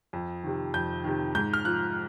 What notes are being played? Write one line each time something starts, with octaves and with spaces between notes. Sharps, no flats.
F2
C3 D#3
F2 G6
C3 D#3
G#2 G6
F6
F3 F#6